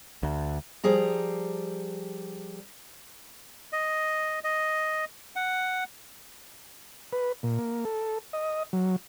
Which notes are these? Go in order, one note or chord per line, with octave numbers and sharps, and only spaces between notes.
D2
F3 G3 G#4 A#5
D#5
D#5
F#5
B4
A#2
A#3
A4
D#5
F#3